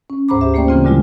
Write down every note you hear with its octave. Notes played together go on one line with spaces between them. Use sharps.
C#4
D2 G#2 C5 A#5 B5 D6
G4 E5
A3 A#3 C#4 C5 D5 G5
C#3 E3 C4 F4
A#2 D3 G3 G#3 E4 F4